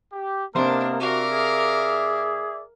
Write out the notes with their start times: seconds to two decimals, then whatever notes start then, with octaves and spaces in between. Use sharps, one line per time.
0.13 G4
0.55 C3 A#3 B3 D4 D#4 A#4 C5
1.00 F#4 A#4 D5 E5 F5 D6
1.30 G#4